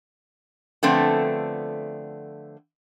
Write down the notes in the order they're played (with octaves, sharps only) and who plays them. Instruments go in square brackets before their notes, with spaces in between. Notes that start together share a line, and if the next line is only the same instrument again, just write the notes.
[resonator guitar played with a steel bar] D3 F3 A3 B3 C4